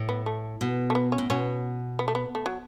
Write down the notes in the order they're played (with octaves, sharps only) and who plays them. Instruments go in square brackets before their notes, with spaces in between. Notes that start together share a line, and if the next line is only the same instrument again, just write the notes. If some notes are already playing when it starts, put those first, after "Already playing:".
Already playing: [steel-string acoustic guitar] A2
[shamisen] B3
A3
[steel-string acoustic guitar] B2
[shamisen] A3
B3
C#4
[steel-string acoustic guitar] A2
[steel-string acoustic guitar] B2 [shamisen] C#4
[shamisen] B3
A3
B3
A3
F#3